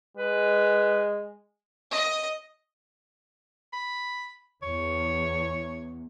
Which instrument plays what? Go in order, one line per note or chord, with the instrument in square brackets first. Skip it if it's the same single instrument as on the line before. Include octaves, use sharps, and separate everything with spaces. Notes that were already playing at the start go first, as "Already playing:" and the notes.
[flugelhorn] G#3 [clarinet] B4
[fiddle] D#5
[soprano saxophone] B5
[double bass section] E2 [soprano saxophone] C#5